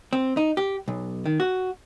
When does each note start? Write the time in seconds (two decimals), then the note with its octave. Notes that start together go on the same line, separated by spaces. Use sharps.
0.13 C4
0.37 D#4
0.57 G4
0.88 B1
1.26 D#3
1.40 F#4